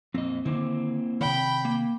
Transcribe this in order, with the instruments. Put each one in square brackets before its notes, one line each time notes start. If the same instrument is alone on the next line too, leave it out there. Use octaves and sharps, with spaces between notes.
[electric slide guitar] F2 A#2 D#5 [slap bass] C4
[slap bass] D3 D#3 [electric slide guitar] A#3 C4 E4
[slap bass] C3 D#3 [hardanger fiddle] G5 B5
[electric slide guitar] A#3